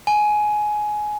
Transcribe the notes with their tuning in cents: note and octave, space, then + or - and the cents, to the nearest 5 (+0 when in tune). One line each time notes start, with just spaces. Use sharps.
G#5 +15